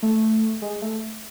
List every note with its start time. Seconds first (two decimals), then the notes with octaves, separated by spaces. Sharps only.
0.03 A3
0.62 G#3
0.82 A3